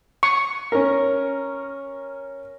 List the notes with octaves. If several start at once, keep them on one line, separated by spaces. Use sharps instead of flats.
C#6
C#4 A#4